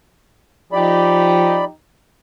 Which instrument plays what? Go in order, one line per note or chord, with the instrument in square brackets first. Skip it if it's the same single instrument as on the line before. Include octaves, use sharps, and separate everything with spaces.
[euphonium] F3 [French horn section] D#4 G4 [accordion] D5 B5